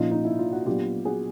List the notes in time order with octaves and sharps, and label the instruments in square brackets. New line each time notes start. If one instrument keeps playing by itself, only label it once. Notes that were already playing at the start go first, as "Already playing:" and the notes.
Already playing: [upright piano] A#2 F3 A#3 C#4 D#4 F4
D#4
E4
F4
F#4
A#2 F#3 B3 D4 F4 G4
F#4 G#4